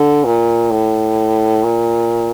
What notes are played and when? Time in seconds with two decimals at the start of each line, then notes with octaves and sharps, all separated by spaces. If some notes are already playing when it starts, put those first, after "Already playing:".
Already playing: D3
0.25 A#2
0.71 A2
1.64 A#2